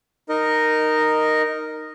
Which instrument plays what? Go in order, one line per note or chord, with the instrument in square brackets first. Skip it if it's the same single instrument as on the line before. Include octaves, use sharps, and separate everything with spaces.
[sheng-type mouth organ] D#4 A#4 D#5